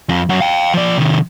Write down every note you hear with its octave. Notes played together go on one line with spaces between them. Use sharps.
F2
F#2 F#4
F5 G5
F3 D5
C3 D#3